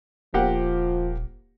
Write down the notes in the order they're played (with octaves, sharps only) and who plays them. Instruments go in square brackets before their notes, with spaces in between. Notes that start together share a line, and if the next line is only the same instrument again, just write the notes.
[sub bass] D#1 [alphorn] F3 [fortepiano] A#3 G4 F#5